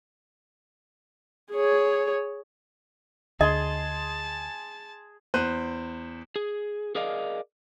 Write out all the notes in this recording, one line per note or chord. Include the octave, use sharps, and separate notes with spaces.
G#4 C#5
D2 G#4 D#5 A5 C6
E2 C5 F#6 D#7
G#4
G#4 A#4 D5 D#5 F5